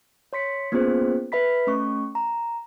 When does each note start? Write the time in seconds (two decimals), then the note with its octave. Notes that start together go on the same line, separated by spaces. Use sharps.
0.33 C#5 C6 B6 C#7
0.72 A#3 B3 C#4 F4 G#4 C5
1.32 B4 E5 B5 B6
1.67 A3 C#4 C#6
2.15 A#5